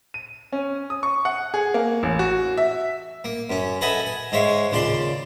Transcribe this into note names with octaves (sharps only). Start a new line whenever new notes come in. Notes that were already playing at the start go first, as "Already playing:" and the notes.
D#7
C#4
D#6
C#6
F#5
G#4
A#3
A1
F#4
E5
A#3
F#2 C#4
A4 B4 D#5 E5 F#5 G#5
G#5
G#2 G#3 C#5 E5 F5
D#2 C#3 F4 D5 C6